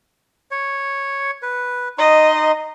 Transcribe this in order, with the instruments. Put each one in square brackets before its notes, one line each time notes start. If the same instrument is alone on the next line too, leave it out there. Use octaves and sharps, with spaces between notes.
[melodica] C#5
B4
[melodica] D#4 C6 [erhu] D#5